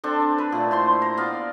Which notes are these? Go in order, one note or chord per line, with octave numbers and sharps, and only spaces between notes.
C4 D4 A4
B4
A#2 A3
E4 C5 C6
A#5
B3 D5 F5